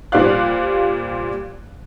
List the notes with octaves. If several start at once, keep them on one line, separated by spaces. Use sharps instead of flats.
A#2 G3 C5 D5 F5 F#6